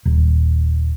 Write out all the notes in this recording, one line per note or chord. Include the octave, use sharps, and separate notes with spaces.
D#1